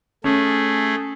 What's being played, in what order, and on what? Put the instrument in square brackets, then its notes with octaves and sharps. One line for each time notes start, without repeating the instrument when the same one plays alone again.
[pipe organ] A3 G#4 [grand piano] C#4